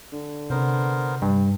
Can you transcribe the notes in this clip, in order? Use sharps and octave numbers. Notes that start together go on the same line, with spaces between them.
D3
C3 B3 A#4 C5
G2